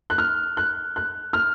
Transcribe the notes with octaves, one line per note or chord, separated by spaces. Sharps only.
F#6
F6
F#6
F#6
F6